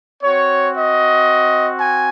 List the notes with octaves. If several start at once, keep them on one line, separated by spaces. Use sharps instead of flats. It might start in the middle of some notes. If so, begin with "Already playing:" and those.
C4 F#4 C#5
D#5
G#5